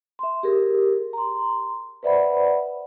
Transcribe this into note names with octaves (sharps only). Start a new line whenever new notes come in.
E5 C6
G4 G#4 A#4
A#5 C6
B4 C5 D5 E5 F#5 B5